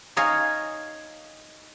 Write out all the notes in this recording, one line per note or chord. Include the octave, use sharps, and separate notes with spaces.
D#4 C#5 D#5 F5 G#5